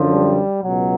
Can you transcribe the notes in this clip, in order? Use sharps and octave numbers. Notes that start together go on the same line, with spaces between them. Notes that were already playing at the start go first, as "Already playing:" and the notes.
Already playing: F#2 D3 F3
G3
C#2 B2 F#3